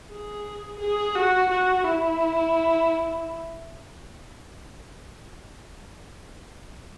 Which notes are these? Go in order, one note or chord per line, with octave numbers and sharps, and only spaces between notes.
G#4
G#4
F#4
F#4
E4